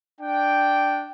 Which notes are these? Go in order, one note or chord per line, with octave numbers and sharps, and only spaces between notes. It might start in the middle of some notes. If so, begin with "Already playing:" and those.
D4 G5